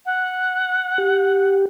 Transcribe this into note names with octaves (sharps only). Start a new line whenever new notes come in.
F#5
G4